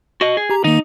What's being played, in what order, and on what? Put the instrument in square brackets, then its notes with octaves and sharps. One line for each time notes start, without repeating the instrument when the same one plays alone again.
[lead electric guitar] F#4 D#5
G#4
[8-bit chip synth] G4 A#5
[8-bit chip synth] D#3 A#3 [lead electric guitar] D#4